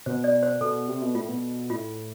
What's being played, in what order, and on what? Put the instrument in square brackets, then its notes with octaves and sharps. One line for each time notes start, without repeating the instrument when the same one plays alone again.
[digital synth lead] B2 [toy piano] C5
[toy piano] D5
C5
[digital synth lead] B2 [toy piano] A4
[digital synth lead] C3
B2
[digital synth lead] A2 [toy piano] F4
[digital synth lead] B2
[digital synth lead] A2 [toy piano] F4